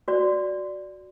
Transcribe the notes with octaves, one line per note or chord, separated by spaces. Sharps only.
F#4 D5